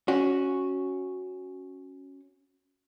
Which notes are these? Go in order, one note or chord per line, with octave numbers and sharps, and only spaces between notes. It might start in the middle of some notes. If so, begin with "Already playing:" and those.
C#4 F#4